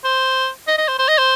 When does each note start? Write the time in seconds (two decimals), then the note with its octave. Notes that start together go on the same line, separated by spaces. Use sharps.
0.04 C5
0.68 D#5
0.78 D#5
0.88 C5
0.99 C5
1.08 D#5
1.18 C5